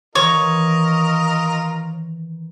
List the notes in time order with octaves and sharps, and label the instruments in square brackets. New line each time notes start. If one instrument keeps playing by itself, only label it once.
[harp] D#3 E3 [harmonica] F4 A#4 D#5 [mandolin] C#5